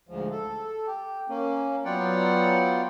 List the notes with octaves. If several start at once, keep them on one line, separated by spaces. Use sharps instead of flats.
D2 G#2 F3
A4
G4
A#3 C#4
F#3 B3 F4 D5 F#5 G5